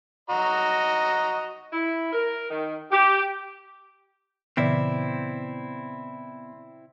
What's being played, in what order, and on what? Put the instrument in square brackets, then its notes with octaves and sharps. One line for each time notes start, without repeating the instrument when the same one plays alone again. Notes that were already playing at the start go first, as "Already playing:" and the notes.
[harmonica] F#4 D#5 A#5
[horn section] E4
A#4
D#3
G4
[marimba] A#2 C#3 E3 [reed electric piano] B3 D5 [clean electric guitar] C4 E4